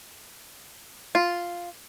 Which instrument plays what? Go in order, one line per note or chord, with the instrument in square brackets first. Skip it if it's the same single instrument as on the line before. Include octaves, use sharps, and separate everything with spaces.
[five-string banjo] F4